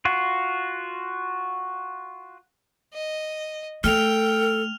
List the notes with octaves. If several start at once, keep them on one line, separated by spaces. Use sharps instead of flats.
F4 F#4
D#5
A3 A4 G5 F6 F7